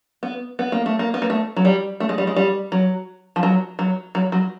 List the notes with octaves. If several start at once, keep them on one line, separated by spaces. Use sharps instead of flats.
B3
B3
A#3
A3
A#3
B3
A#3
A3
F#3
G3
A3
G#3
G3
G#3
G3
F#3
F3
F#3
F#3
F#3
F#3